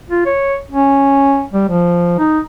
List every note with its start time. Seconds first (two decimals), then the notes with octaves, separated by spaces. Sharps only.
0.10 F4
0.26 C#5
0.71 C#4
1.53 G3
1.68 F3
2.19 D#4